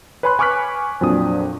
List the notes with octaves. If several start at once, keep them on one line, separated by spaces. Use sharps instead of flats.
B4 C#5 G#5 B5 C6 F#6
G#5 C#6 D6 F6 F#6 B6
F2 A#2 F#3 D4 D#6